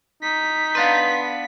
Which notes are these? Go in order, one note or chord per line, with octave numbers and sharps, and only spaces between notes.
D#4 B6
B3 D4 B4 F5 C6